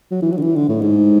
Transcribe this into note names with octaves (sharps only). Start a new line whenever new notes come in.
F#3
E3
F#3
D3
E3
D3
A2
G#2